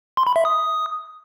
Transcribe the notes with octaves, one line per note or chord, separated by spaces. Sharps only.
C6
B5
E5
D#6